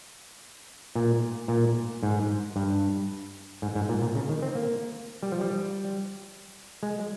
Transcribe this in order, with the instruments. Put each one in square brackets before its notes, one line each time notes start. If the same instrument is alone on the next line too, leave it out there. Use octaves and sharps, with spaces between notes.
[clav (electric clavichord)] A#2
A#2
G#2
G2
G#2
G#2
A#2
A#2
C#3
D#3
C4
A#3
G3
F3
G3
G#3